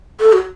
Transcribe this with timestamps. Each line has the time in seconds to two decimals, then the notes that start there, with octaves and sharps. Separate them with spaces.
0.20 A4
0.33 F#4